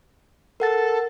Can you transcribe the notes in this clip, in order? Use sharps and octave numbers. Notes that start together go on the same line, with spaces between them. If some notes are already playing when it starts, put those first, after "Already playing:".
A4 A#4 F#5 A6